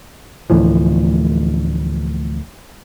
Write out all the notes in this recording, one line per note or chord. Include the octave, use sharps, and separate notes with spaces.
D2 A2 E3 F3